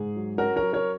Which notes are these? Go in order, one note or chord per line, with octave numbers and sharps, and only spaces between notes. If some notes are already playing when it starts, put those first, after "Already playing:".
Already playing: G#2 G#4
F#3
C#4 F#4 A#4
A#4 C#5
F#3
A#4 C#5